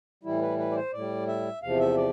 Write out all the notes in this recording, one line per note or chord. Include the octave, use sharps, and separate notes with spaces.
A2 E3 G3 E4
B4
B4
D5
C5
A2 G3 D5
E5
E2 C3 F3 F5
E5
D5